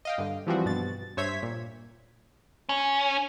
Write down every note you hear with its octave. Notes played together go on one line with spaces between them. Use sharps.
D#5 F5 G5
G2 D3
E3 F3 G3 C4 F#4
G2 B2 A6
G2 C5 C#5 E5 G#6 B6
A#2
C#4